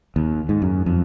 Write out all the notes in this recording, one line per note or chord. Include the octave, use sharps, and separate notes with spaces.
D#2
G#2
F#2
F2